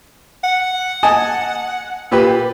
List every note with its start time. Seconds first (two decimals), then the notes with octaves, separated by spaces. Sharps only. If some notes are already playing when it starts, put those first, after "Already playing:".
0.44 F#5
1.03 D#5 G#5 A5
2.12 A#2 G4 B4